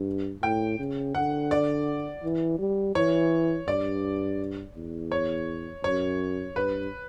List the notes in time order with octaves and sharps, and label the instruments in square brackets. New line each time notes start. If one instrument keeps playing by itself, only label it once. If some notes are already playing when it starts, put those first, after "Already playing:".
Already playing: [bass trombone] G2
[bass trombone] A2 [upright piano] G5
[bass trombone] C#3
[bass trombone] D3 [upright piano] F#5
[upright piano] D5
[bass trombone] E3
G3
[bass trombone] E3 [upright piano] C#5
[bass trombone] G2 [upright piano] D5
[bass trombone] E2
[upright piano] C#5
[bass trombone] F#2 [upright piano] C#5
[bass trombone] G2 [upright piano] B4